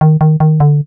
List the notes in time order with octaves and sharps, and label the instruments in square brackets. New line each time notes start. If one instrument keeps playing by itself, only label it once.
[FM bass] D#3
D#3
D#3
D3